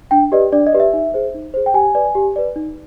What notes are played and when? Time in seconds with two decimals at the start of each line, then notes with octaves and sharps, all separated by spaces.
0.11 D4 G5
0.32 G4 B4 D5 D#5
0.52 D4 D5
0.66 D#5
0.73 G4 B4 D5
0.80 E5
0.93 D#4
1.14 G#4 C5
1.34 D#4
1.54 G#4 C5
1.66 G5
1.74 G4 G#5
1.95 B4 D5
2.15 G4
2.36 B4 D5
2.56 D#4